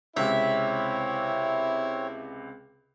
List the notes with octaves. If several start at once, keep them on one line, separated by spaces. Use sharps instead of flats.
C#2 C3 C4 E4 C#5 E5